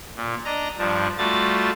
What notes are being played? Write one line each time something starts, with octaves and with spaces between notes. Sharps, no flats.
A#2
D4 D#5 A#5
G2 F3 D4
G3 A3 F4 F#4 A6